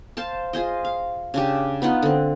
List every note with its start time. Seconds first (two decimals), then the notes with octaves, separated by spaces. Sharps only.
0.17 C5 F5 A5
0.53 F4 G#4 C5 D#5
0.85 F5
1.34 C#3 D4 G4
1.82 B3 D#4 F4 F#5
2.02 D3 C4